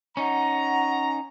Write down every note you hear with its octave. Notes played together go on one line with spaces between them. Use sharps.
C#4 D#4 F#5 A#5